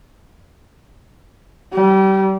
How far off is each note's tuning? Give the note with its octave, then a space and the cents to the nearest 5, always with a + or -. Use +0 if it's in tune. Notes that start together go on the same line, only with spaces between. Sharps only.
G3 -30